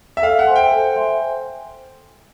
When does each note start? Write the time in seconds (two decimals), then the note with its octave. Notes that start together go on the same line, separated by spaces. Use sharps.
0.17 E5
0.22 A4 F5
0.39 F#5
0.47 C5 E5 G#5 C6
0.56 G5
0.72 A4
0.96 C5 E5 G#5 C6